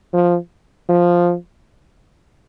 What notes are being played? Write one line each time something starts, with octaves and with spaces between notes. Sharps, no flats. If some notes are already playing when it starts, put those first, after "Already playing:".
F3
F3